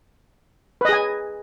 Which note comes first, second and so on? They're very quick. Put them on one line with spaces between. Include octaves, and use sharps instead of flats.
B4 D#5 G#4 G#5